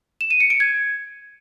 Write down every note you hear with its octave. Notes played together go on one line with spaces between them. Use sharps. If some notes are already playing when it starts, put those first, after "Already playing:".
E7
D#7
C#7
D7
G#6